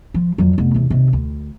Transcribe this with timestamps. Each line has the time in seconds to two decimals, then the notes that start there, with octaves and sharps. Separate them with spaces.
0.14 F3
0.38 F2 F#3
0.58 F1 B3
0.74 E2 C3
0.90 D#2 C3
1.13 D2